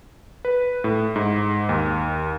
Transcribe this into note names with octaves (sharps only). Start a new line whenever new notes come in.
B4
A2
G#2
D#2